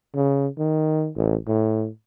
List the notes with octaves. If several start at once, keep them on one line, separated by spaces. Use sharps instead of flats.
C#3
D#3
A1
A2